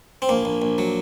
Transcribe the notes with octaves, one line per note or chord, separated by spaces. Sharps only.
C4
A#1 A#3
A#1
A#1
F#3